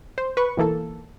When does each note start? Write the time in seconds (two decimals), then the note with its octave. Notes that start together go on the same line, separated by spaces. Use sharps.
0.18 C5
0.37 B4 C#6
0.57 B1 E3 A#3 A4